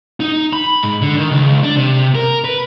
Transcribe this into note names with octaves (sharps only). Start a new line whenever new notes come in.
D#4
B5
G#2
D3
D#3
C#2
D4
C3
A#4
B4